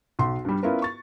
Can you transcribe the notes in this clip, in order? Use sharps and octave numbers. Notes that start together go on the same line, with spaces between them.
B1 C6
G2 G3
B3 C#4 E4 F4 A#4 B4
C#6 A6